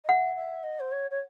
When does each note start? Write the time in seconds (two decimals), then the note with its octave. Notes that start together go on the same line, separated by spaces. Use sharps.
0.04 D#5
0.09 E5 F#5
0.36 E5
0.63 D#5
0.80 C5
0.92 C#5
1.10 C#5